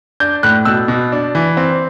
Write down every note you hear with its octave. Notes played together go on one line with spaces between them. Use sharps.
D4 G6
A2 F#6
B2 E6
B2
D4
E3
C4